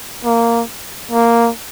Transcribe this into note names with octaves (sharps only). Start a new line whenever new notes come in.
A#3
A#3